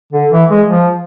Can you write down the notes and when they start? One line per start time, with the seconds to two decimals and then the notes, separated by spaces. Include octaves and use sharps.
0.13 D3
0.32 E3
0.50 G#3
0.69 F3